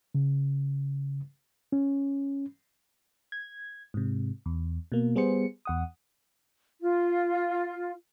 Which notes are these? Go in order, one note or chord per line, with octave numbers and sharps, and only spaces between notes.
C#3
C#4
G#6
G#2 C3
E2
B2 A#3
G3 B3 G#4 C5 C#7
E2 F#5 D#6
F4